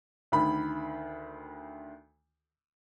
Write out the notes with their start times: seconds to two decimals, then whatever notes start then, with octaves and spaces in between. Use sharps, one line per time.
0.32 D2 D#3 B5